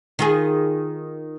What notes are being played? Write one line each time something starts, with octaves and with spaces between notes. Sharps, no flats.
D#3 F4 G#4